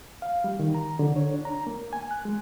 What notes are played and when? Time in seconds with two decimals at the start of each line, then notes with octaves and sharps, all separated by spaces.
0.22 F5
0.44 G3
0.60 D#3
0.75 A#5
0.99 D3
1.16 C#5
1.34 D4
1.45 A#5
1.67 A#3
1.93 G#5
2.11 F#6
2.25 G#3